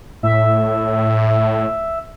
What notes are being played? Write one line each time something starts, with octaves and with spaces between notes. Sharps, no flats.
A2 E5